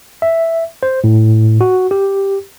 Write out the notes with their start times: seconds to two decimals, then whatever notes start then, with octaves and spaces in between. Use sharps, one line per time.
0.22 E5
0.83 C5
1.04 A2
1.61 F#4
1.91 G4